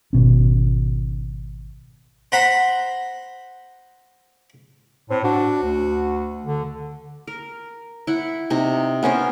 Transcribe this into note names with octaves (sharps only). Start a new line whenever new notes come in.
G#1 B2 C#4
C5 F#5 A#5 B5
A2 C4
D4 F#4
D2
D3
A#4
E4 F#5
C3 D#4
B3 C#4 A#4 C5